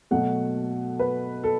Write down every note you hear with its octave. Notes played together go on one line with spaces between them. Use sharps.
B2 F#3 A3 F#5
B4
A4